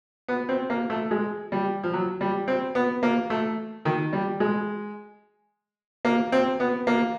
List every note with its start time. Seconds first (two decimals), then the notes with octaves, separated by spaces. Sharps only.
0.28 B3
0.49 C4
0.70 A#3
0.90 A3
1.11 G#3
1.52 G3
1.83 F3
1.93 F#3
2.21 G3
2.48 C4
2.75 B3
3.03 A#3
3.30 A3
3.85 D#3
4.13 G3
4.40 G#3
6.05 A#3
6.32 C4
6.60 B3
6.87 A#3